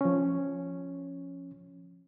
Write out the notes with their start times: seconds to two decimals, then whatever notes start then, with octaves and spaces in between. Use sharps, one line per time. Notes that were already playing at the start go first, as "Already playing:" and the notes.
0.01 F3 C#4